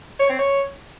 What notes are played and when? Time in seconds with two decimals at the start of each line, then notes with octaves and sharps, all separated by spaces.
0.20 C#5
0.29 C4
0.39 C#5